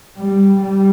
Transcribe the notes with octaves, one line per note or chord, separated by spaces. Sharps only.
G3
G3